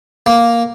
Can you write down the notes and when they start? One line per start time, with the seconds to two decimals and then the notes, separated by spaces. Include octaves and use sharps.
0.26 A#3